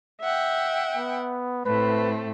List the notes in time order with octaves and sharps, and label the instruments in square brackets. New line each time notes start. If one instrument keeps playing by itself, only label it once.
[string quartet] E5 F#5 G5
[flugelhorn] B3
[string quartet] A2 A3 C4 [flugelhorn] B4